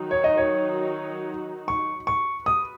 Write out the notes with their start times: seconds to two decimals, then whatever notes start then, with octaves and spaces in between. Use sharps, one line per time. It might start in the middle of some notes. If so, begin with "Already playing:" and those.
Already playing: D#3 F#3 D#4 F#4
0.11 C#5
0.24 D#5
0.37 C#5
1.68 C#6
2.07 C#6
2.46 F#4 B4 D#6